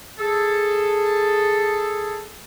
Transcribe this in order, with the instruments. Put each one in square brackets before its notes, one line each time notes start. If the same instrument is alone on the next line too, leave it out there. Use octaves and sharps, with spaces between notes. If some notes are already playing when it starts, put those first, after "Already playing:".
[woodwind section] G#4 A4